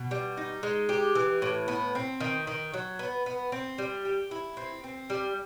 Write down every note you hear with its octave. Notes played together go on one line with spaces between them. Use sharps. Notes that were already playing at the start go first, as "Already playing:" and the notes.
Already playing: B2
G3
D#4
G#3
G4
E3
A2
B3
C4
D#3
D#3
F#3
B3
B3
C4
G3
G4
E4
C4
C4
G3